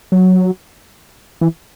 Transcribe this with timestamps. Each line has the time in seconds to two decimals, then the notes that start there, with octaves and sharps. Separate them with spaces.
0.12 F#3
1.41 E3